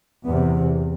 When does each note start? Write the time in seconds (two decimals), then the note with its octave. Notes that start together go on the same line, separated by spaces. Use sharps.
0.25 E2 C3 B3